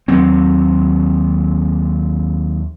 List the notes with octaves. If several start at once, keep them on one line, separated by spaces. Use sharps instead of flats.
D#2 F#3 C4